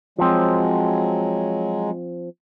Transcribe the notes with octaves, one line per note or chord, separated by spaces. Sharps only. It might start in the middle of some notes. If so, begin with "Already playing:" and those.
F3 F#3 G#3 C4